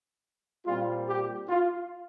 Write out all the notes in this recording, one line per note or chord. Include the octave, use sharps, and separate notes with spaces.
A#2 G3 C4 F4
G4
F4